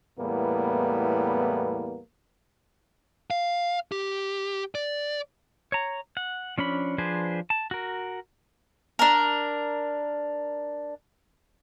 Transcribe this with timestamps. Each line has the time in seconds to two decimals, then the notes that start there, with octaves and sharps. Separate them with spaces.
0.19 E2 A2 G3 A#3 B3
3.31 F5
3.92 G4
4.75 D5
5.72 C#5 A#5
6.17 F#5
6.58 F3 C#4 D4 B5
6.98 F3 D4 G#4 B4 C5
7.50 A5
7.71 F#4 A#4
8.99 D4 A#4